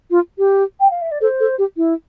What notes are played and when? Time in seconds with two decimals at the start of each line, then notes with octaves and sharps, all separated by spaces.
0.11 F4
0.38 G4
0.80 G5
0.90 F5
1.01 E5
1.11 D5
1.21 A4 C5
1.40 A4
1.58 G4
1.77 E4